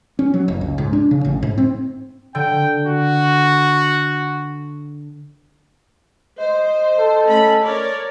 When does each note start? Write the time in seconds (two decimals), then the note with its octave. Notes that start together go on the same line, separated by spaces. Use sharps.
0.19 C#4
0.34 F#3
0.48 F#1
0.61 C#2
0.78 G#2
0.93 D4
1.11 C#3
1.25 A1
1.43 G#2
1.58 C4
2.35 D3 G5
2.87 F#4
6.40 C5 D#5
6.99 A4
7.28 A3 C#4 B5
7.64 A#4 C#5 D5